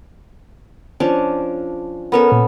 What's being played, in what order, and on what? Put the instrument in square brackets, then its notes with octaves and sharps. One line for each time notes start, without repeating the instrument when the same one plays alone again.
[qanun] F3 C#4 D4
[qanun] B3 C#4 A4 [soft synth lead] A#4
[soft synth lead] A#2